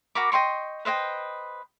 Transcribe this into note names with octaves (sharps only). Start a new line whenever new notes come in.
F#4 A#4 B5 D6
D#5 G5 C6 C#6
B4 C5 D#5 G5